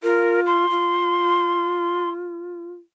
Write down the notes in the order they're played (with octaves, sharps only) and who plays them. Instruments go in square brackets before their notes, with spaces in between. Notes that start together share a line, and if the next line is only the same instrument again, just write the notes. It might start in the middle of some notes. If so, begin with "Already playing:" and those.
[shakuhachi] F4 [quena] A#4
[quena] C6
[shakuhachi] F4